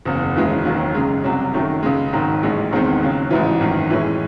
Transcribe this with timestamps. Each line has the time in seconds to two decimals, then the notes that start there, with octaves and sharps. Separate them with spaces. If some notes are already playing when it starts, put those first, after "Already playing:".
0.05 F#1 E2 C#3
0.36 E1 D#2 C#3 E3 G#3
0.65 E1 D#2 D#3 F#3
0.94 F#2 C#3 G#3
1.24 C2 C3 F#3
1.54 F#2 D#3 F#3 A3
1.83 C#2 C#3 G#3
2.13 G#1 G#2 D#3 F#3
2.43 A1 A2 G#3 C#4
2.72 E1 E2 D#3 G#3 C4
3.02 D#2 C#3 F#3
3.31 A1 G#2 E3
3.60 G#1 F#2 D#3
3.90 A2 E3 G#3 C#4